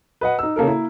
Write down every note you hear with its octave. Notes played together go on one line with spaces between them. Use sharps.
B4 D#5 F#5
D#4 E6
C#3 A#3 A4 A#4
A#3 E4